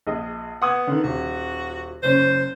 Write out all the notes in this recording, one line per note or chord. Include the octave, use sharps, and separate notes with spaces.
A#1 G#4 D#5
B3 F#5 D#6 G#6
D3 D#3
D#1 F#4
F#1 C#4 C5